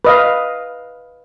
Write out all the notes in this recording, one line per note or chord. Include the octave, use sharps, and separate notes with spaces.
B4 D#5 F5